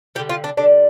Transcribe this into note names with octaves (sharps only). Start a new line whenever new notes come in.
D3 G3 G4
F4
D4
D3 G3 D4